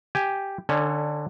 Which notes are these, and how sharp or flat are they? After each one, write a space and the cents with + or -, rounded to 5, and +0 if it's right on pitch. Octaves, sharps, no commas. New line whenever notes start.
G4 +0 G#5 +0
D3 +20 C#4 +0 A4 +0